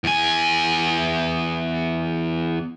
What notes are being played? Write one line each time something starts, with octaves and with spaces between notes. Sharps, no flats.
E2 G#5